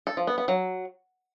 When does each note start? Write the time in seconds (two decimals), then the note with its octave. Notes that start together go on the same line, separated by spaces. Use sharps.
0.07 A4
0.17 F3
0.27 B3
0.38 B3
0.48 F#3